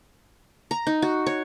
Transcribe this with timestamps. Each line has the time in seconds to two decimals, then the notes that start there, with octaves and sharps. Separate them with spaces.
0.71 A#5
0.87 D#4
1.02 F#4
1.26 C#5